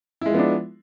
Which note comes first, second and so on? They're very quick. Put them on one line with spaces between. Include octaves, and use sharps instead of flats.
E4 G#3 F3 B3 D4